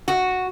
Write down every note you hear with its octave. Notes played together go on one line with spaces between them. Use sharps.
F#4